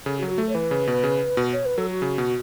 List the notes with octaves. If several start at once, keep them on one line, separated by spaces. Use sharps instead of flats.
C#3 A4
F#4
F#3 A4
F#4
A3 A4
C#5
E3 B4
C#3
B2
C#3
B2
C#5
B4
F#3 A4
F#4
C#3
B2